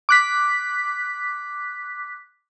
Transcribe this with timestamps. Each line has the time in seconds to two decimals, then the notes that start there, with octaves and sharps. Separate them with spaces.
0.09 D6 F#6 B6